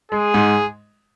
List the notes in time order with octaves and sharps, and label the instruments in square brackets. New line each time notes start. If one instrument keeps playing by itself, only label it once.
[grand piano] G#3 [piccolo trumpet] G#4
[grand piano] G#2